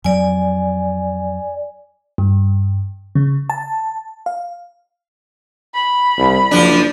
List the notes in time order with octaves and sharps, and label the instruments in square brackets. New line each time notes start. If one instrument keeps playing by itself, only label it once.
[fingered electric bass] F2 F#3 [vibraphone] D5 G#5
[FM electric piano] G2
C#3
A5
F5
[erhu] B5
[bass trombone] C2
[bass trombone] F#1 [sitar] F3 D4